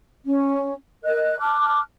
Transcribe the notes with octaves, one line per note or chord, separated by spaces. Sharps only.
C#4
A#4 D#5 F#6
A5 D6 F6 F#6